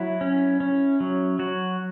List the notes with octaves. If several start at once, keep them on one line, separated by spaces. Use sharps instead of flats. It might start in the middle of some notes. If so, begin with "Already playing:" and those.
Already playing: F#3 E4
C#4
C#4
F#3
F#3 F#4